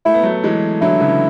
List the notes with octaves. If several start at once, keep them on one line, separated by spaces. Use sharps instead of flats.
A3 E4
B3
F#3 A3
E3 G#3
D3 F#3 E4
C#3 E3